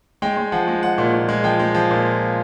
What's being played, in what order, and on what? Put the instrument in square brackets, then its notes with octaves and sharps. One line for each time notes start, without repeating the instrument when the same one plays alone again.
[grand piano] G#3 G5
G#3
F3 F#5
G#3
G#3 F#5
A#2
A#2
G#3
F3 G5
G#3
F3
A#2